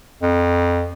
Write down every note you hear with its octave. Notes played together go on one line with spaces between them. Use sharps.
F2